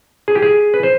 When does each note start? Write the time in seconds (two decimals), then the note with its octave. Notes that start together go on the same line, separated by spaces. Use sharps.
0.28 G#4
0.35 G4
0.42 G#4
0.74 B4
0.83 C5